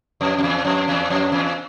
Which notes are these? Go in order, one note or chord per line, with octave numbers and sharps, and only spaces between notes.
F2
F2
E2
F2
E2
F2
E2